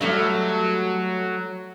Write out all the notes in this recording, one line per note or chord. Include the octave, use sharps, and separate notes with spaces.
F#3 G3 A3 D#5